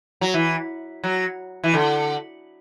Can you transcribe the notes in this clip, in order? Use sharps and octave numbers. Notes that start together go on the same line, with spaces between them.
F#3
E3
F#3
E3
D3